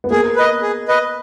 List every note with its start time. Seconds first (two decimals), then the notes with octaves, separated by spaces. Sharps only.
0.04 B3
0.11 A#3 G#4
0.36 B4 D#5
0.62 G#4
0.88 B4 D#5